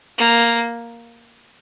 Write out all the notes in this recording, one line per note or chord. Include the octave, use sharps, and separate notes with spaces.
A#3